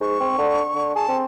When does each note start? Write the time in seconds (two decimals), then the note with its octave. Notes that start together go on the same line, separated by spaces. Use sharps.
0.01 G#2 C#6
0.20 C4
0.38 D3
0.74 D3
0.95 G#4 A5
1.08 C4